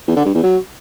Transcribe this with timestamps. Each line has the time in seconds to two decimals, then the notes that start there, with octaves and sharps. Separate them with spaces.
0.07 E2
0.16 D3
0.25 G2
0.34 E2
0.43 F#3